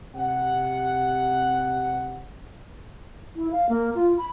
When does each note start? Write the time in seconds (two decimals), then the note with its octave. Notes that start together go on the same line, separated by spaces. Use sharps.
0.14 C3 F#5
3.36 E4
3.51 F5
3.69 A#3
3.95 F4
4.18 B5